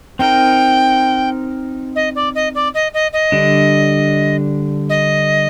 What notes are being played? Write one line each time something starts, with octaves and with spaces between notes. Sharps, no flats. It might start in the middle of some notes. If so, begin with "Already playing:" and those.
C4 D#4 A#4 G5
D#5
D5
D#5
D5
D#5
D#5
D#5
D3 G3 D4
D#5